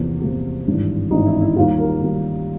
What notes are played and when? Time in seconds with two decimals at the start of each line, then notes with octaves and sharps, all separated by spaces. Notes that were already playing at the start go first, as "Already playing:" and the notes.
Already playing: E2 C3 F3 A#3
0.22 E2 C3 F3 A#3
0.67 G#1 G2 E3
1.11 G#1 G2 E3 D#4
1.26 E4
1.41 E4
1.56 D#2 D#3 G3 A#3 F4
1.79 A#4
2.01 D#2 D#3 G3 A#3